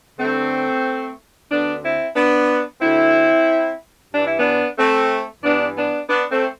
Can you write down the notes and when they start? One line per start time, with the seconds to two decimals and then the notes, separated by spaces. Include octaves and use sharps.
0.19 G2 D3 A3 C4
1.50 D2 D3 B3 D4
1.84 C4 E4
2.15 B3 D4
2.81 D2 D3 C4 E4
4.12 G2 E3 D4
4.26 E4
4.39 B3 D4
4.78 A3 C4
5.43 G2 E3 B3 D4
5.76 B3 D4
6.09 B3 D4
6.31 A3 C4